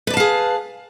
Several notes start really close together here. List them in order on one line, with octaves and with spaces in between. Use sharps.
B4 D5 A5 F5 G#4